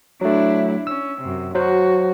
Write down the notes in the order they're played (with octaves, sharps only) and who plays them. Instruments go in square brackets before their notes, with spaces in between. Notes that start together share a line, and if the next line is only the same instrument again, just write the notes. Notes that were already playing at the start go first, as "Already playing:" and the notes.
[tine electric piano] F#3 A3 [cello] D4 E4
[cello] C#4 [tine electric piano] E6
[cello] F#2 C3
[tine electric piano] F#3 C5 [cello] F#4